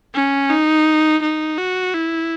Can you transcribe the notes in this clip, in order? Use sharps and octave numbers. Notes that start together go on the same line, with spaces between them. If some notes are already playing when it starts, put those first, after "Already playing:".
C#4
D#4
D#4
F#4
E4